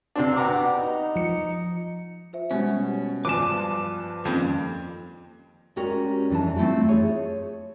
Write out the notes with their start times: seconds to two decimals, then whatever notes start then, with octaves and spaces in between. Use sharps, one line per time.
0.16 C3 C4 D4
0.36 B3 F#4 G4 A#5 D6
0.78 D#4
1.16 F3 C#7
2.33 F4 C5 E5
2.51 B2 G3 G#3 C#4 G4
3.25 G2 F3 B4 C5 G#5 D6 E7
4.25 F2 D#3 G3 A#3 C#4
5.76 G#3 C#4 F#4 G4 A#4 D5
6.30 F2 E3 D4 A5
6.55 A3 C4 E4 F4 G4
6.89 G#4 C#5